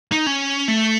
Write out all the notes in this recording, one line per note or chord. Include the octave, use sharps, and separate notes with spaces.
D#4
C#4
A3